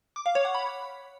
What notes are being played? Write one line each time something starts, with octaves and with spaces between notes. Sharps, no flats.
D6
F5
C#5
F#5
B5